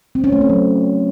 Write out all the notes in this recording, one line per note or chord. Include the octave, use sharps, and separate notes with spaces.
C4
C#4
A3
C4
F#3